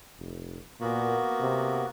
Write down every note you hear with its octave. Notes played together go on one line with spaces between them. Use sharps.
F1
A#2 A#3 B3 F#4
C3